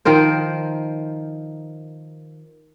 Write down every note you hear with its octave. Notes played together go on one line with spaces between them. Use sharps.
D#3 F3 A#4 C5